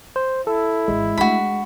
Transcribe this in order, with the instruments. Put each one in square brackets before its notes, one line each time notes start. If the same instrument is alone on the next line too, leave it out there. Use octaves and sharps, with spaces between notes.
[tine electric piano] C5
[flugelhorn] E4 [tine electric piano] A4
[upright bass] G#1 E3 [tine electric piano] G#3
[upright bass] A3 D4 [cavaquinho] F#4 B5